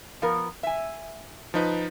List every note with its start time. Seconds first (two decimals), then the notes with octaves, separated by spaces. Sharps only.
0.22 F3 B3 A#4
0.63 E5 G#5
1.54 F3 D#4 B4